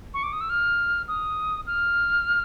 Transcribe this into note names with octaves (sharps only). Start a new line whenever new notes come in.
C#6
D6
D#6
E6
F6
D#6
F6